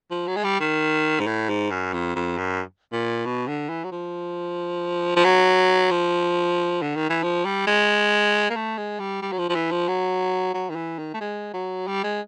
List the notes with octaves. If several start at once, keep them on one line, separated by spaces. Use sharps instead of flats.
F3
F#3
G#3
G3
D#3
G#2
A2
G#2
F#2
F2
F2
F#2
A#2
B2
D3
E3
F#3
F3
F3
F#3
F3
D3
D#3
E3
F3
G3
G#3
A#3
A3
G#3
G3
G3
F#3
F3
F3
E3
F3
F#3
F#3
D#3
E3
D#3
A3
G#3
F#3
G3
G#3